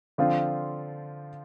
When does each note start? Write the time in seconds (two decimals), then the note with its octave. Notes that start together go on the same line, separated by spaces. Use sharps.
0.18 D3 F3 C4 F4